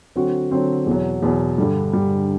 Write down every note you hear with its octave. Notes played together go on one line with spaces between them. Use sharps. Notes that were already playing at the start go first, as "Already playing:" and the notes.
D3 F#3 C4 F#4
D3 F#3 C4 F#4
E2 B2 F#3
E2 B2 F#3
G2 D3 G3
G2 D3 G3